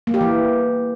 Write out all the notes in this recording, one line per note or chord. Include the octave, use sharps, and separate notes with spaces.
A#3
G4
E3